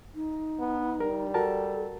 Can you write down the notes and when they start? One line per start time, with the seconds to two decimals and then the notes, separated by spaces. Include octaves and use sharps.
0.15 D#4
0.60 B3
1.00 G3 A#4
1.34 F#4 A4 A#4 A5